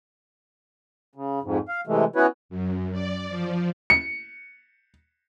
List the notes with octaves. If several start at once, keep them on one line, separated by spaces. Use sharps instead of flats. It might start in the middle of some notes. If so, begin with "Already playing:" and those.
C#3
F2 G#2
F5
C3 E3 G#3 A3
B3 C#4 E4 F#4 B4 C#5
F#2
D5
F3
C#7